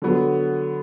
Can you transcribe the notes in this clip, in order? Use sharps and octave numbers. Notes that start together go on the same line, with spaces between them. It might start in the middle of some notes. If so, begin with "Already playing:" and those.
D3 F#3 B3